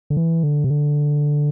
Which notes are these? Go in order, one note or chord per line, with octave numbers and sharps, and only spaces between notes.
D3
E3
D3
C3
D3